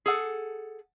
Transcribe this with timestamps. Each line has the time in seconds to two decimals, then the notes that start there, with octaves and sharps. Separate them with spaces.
0.06 G#4 A4 F#5